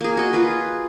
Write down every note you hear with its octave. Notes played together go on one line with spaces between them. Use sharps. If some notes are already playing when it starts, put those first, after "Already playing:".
A#3 G#4
F#4 D#5
F4 G#4 B4